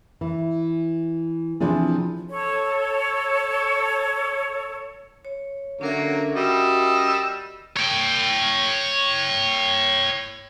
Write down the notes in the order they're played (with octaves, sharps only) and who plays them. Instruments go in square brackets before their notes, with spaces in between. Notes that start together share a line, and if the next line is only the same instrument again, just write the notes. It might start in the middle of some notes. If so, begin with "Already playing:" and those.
[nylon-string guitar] E3
C3 E3 F3 D4 G#4
[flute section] A4 C#5
[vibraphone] C#5
[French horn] D3 [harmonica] F#3 A#3 [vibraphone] C#4 A#4 E5
[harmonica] G3 D#5 E6 [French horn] F#4
[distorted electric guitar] C#5 G5